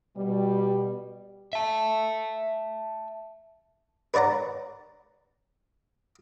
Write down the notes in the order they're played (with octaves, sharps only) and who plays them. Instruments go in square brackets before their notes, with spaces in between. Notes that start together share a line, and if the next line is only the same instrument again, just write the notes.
[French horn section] B2 G3
[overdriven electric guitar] E5 A5
[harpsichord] B4 C#5 D5 F#5 A#5